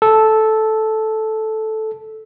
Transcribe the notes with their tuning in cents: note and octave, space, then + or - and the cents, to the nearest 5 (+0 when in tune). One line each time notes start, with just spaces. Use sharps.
A4 -10